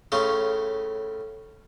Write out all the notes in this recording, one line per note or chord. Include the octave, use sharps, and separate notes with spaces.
A2 C#3 C#4 F4 A4